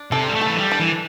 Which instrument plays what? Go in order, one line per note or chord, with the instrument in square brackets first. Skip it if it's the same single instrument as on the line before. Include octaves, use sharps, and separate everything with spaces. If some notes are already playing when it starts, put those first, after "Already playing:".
Already playing: [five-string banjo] D4
[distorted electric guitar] C3 [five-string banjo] A4
[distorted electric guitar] G3
A3
[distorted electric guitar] E3 [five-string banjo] A4
[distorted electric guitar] G3
[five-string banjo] D4
[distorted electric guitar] E3